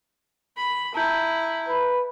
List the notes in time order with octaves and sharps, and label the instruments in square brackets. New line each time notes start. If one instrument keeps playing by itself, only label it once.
[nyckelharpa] B5
[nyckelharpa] E4 [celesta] A5 A#5 G6
[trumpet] B4